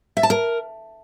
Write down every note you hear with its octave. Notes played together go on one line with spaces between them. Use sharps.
E5
A5
A#4